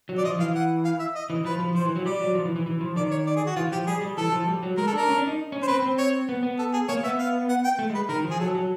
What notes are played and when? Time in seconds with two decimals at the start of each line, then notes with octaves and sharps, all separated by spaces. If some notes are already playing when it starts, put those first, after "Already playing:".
0.09 F#3
0.18 D5
0.24 F3 D#5
0.39 E3 F5
0.55 F#5
0.85 F5
1.00 E5
1.15 D#5
1.30 E3
1.45 F3 B4
1.60 F3
1.75 F3 C5
1.85 E3
1.96 F#3
2.06 G3 D5
2.21 F#3
2.35 F3
2.45 E3
2.56 E3
2.66 E3
2.81 F3
2.96 D#3 D5
3.11 C#5
3.27 D5
3.36 G#4
3.46 F#4
3.56 E3 F4
3.72 F3 G4
3.87 G3 G#4
4.01 G3
4.17 E3 A4
4.32 F3
4.48 G3
4.63 F#3
4.77 G#3 A#4
4.87 A4
4.93 D4 A#4
5.08 C#4
5.17 D4
5.27 D#4
5.52 C#4
5.62 C5
5.67 C4 B4
5.82 C4
5.98 C#5
6.29 B3
6.43 B3
6.59 A4
6.73 G#4
6.88 A#3 C#5
7.03 B3 E5
7.19 F5
7.49 F#5
7.64 G5
7.79 A3
7.90 G#3
7.95 B4
8.09 D#3 A#4
8.24 F3
8.31 G#4
8.40 F#3 A4
8.55 F#3